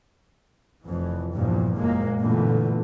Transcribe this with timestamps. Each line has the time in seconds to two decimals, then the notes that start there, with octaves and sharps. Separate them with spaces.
0.86 F1 F2 E3
1.34 E2 G2 A#2 F3
1.76 F#1 A#2 G#3 A#3
2.22 A#2 D3 E3 A3 B3